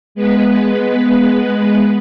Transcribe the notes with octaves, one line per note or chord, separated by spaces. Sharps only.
G#3 B3 B4